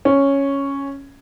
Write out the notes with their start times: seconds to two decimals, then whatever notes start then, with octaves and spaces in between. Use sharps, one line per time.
0.05 C#4